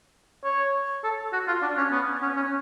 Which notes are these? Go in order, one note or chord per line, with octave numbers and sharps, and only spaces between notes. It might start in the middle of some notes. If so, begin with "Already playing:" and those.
C#5
A4
F#4
F4
D4
C#4
B3
C#4
C#4